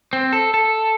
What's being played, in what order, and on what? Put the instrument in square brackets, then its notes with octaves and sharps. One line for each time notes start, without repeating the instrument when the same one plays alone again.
[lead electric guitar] C4
A4
A4